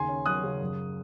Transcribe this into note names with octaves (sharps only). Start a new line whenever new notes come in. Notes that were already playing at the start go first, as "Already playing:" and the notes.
Already playing: D#2 C#3 G#5 C6
C#4
F#3 D#6 F#6
C#3
F#2